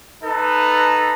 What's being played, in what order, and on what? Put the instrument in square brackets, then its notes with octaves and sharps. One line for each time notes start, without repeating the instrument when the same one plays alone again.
[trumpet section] D#4 A4 B4